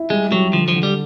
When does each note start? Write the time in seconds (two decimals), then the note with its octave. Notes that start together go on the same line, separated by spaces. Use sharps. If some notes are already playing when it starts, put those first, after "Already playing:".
Already playing: E4
0.10 G3 G#3
0.31 F#3 G3
0.53 D3 F3
0.68 F3
0.76 D3
0.83 G3